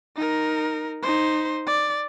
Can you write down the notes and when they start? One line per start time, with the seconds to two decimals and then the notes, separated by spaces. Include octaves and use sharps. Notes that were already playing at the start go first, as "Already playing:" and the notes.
0.17 D#4 A#4
1.03 D#4 C5
1.67 D5